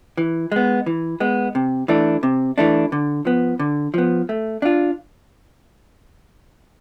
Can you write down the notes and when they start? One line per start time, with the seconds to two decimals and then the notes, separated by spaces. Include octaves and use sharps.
0.17 E3
0.52 G#3 B3
0.86 E3
1.20 G#3 B3
1.55 C3
1.88 E3 A3 D4
2.23 C3
2.58 E3 A3 D4
2.92 D3
3.25 F3 B3
3.59 D3
3.94 F3 B3
4.29 A3
4.62 D4 F4